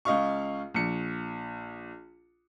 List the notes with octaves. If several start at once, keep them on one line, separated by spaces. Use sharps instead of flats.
C#2 D#5 F5 C#6
A#1 C#7